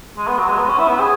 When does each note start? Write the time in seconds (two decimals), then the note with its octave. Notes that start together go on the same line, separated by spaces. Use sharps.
0.17 G#3
0.27 B3
0.38 F#3
0.48 G#3
0.58 B3
0.68 C#4
0.78 E4
0.88 B3
1.00 G#4